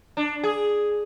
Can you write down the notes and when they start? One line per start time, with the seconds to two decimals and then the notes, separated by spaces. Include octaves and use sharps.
0.17 D4
0.43 G#4